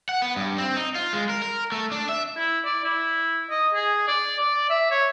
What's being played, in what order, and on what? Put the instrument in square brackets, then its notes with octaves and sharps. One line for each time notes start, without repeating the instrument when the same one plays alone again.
[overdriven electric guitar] F#5
B3
G2
C4
D#4
F4
G#3
A#4
A#4
A3
D4
E5
[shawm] E4
D5
E4
D#5
G#4
D5
D5
E5
C#5